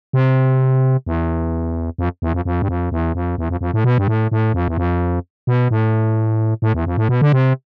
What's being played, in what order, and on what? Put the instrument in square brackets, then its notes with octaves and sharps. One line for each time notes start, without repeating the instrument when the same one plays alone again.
[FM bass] C3
E2
F2
E2
F2
F2
G2
F2
E2
F2
E2
F2
F2
A2
B2
G2
A2
A2
F2
E2
F2
B2
A2
A2
E2
F2
A2
B2
D3
C3